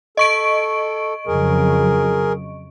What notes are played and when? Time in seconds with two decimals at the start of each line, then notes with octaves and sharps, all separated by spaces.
0.17 A4 D#5 C#6 D7
1.27 F2 C#3 F#3 G#4 A#4